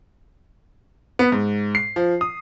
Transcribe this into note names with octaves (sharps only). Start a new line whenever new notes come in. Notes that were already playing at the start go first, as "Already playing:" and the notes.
B3
G#2
C7
F3
D#6